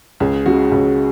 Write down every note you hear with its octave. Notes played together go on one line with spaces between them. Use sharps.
C#2 G#4
C#3 G#3 F#4
C#2